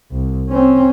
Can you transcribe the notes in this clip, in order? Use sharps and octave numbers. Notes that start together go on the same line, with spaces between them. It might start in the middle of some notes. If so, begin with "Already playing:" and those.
C2
C4 C#4